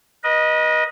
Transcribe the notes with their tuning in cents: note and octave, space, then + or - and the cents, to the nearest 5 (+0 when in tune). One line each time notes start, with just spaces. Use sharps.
B4 -40 D#5 +0